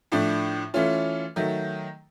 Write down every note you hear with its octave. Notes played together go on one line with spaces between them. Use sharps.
A2 F3 A3 D4
E3 A3 C#4 F4
D#3 F#3 A3